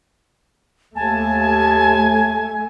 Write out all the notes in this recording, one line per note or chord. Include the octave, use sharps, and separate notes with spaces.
D#2 A3 G#5 A5